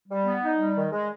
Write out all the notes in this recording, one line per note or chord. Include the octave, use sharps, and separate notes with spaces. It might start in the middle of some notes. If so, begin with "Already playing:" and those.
G3
B3
D#4
G3
D#3
G#3